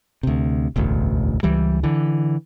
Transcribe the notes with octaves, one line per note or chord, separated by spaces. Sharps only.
D2 C3
E1 A1 D2
C#2 E3 G3
D3 E3